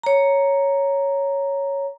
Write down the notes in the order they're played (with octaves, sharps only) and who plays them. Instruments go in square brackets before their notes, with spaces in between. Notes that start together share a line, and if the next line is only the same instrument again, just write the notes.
[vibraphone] C#5 A#5